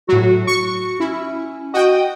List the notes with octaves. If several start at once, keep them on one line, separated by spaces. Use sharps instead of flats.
A2 F#3 F#4
F#4 C#6 C#7
C#4 E4
F#4 D#5 G5